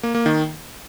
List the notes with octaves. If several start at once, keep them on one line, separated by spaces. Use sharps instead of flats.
A#3
A#3
D#3